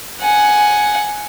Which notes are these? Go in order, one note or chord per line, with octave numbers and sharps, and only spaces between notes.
F#5 G#5